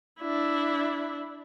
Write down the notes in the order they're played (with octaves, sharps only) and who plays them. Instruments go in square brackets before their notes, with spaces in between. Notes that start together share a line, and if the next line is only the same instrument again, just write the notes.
[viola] D4 E4